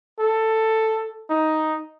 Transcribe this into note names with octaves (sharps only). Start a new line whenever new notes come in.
A4
D#4